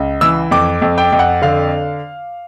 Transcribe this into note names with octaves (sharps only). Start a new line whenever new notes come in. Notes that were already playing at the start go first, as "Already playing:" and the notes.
Already playing: C#2
E3 E6
F2 D6
F2
G5
F2
F#5
D3 F5